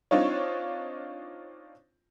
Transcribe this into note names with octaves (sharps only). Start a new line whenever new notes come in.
C4 D4 D#4 F4 C#5